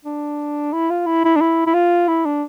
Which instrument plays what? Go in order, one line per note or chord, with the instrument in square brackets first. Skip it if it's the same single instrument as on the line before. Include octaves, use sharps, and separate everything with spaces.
[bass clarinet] D4
E4
F4
E4
E4
D4
E4
E4
F4
E4
D4